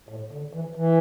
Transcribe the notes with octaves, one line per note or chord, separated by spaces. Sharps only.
A2
D3
E3
E3